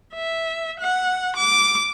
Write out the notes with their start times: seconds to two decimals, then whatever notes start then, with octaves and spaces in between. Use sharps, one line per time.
0.14 E5
0.80 F#5
1.36 D6